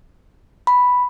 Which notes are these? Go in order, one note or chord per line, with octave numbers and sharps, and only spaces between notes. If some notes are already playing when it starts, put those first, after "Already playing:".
B5